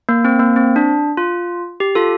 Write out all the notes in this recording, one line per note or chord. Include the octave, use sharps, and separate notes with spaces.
A#3
C4
A#3
C4
D4
F4
G4
F4 A4